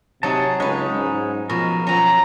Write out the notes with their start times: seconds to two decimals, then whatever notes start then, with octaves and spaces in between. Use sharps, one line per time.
0.23 C3 F#3 D#4 G#4 F#5 A5
0.60 C#2 G#3 C#4 D#4 B4
0.94 G#2
1.50 B2 F3 A#4
1.87 F3 F#3 C#4 A#5